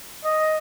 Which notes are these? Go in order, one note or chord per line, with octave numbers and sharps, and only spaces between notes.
D#5